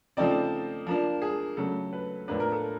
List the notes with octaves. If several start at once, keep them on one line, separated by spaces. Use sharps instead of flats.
C#3 F3 A3 C4 D#4 D5
F3 A#3 D4
G#4
C#3 F#3 A3 A4
B4
A2 F3 A#3 D4 B4
A#4
A4